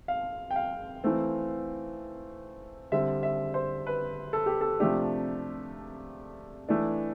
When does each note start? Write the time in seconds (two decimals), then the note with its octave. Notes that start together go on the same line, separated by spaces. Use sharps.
0.08 F5
0.51 G5
0.56 F5
1.04 E3 A3 C4
2.92 D3 G3 C4 E5
3.23 E5
3.54 C5
3.87 B4
4.33 A4
4.46 G4
4.61 A4
4.80 C3 F3 A3 D4 G4
6.69 E3 A3 D4